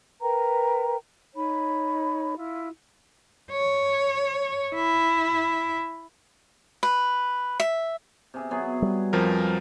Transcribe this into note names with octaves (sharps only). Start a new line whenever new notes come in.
A#4 B4 G5 A#5
D#4 C#5 B5
E4 F4
C#5
E4
B4
E5
C3 G#4 E5
F#3 B3 G#4
G3
F2 F3 A#4